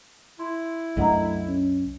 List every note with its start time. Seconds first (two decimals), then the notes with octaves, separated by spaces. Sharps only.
0.39 E4 C6
0.97 C2 F#2 A3 D4 D#5 F#5 A#5
1.48 C#4